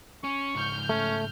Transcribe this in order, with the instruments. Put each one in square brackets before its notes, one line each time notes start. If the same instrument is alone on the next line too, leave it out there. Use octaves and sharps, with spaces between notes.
[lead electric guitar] C#4 [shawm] C#6
[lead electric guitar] C#2 G#2 [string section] F6 G6
[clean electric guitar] A3 [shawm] C#4